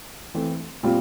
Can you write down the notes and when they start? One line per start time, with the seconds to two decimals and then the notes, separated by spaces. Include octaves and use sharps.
0.34 E3 A3 C4
0.83 A#2 G3 C4 F4